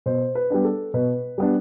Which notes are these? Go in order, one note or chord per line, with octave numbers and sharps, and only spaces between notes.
B2 C5
B4
G3 B3 D4
A4
B2 B4
G3 B3 D4